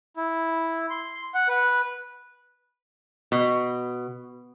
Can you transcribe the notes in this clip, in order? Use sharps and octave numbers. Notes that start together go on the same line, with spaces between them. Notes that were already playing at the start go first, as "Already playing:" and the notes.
E4
C6
F#5
B4
B2